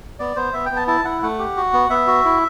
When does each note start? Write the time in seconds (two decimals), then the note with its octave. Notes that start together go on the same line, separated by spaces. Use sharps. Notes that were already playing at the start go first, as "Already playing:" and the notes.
0.19 B3 D5
0.36 B3 C5
0.53 B3 E5
0.66 G5
0.71 B3 A5
0.88 E4 A5
1.05 E4 F#5
1.23 A3 F#5
1.39 G4
1.57 F#4
1.73 B3
1.90 B3 E5
2.07 F#4
2.25 E4